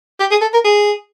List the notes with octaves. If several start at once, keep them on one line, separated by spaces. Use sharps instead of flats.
G4
G#4
A4
A#4
G#4